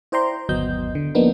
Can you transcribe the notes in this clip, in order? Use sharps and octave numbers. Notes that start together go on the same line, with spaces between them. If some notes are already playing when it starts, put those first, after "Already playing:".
E4 C5 D5 G5 A#5 C6
G1 D#2 F#3 B3 D#5 G6
D3
F3 A#3 B3 D4 D#4